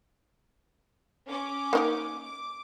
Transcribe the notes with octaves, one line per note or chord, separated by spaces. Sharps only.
C#4 D6
A#3 D#4 A#4
D6